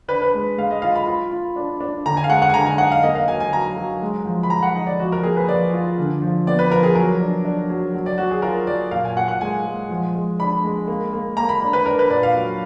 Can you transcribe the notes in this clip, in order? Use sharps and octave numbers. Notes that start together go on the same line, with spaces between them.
D4 B4
B4
G#3
G#3 F5
D#5
F4 F5
B5
F4
F4
D4
D4
D3 A#5
G#5
F5
G#3 F#5
F#5
G#5
D3 A#5
G#5
D#4 F#5
F5
A#3 D#5
F5
F#3 G#5
G#5
F#3 A#5
F#3
G#3
F3
B5
F3 A#5
F#5
D#4 D#5
D5
F3 F#4
A#4
A#3 G#4
B4
F3 D5
F4
D3
F3
B3 D5
B4
F3 A#4
G#4
F#3 A#4
D4
D4
F#3
F#3
D5
F#3 F#4
G#4
F4 A#4
F#3 D5
A#2 F5
G#5
A#2 F#5
F#5
G#3 G#5
G#3
F3
G#3
D4 B5
G#3
A#3
A#3
A#3 A#5
B5
D4
B4
D4 A#4
B4
A#2 D5
F5
F#3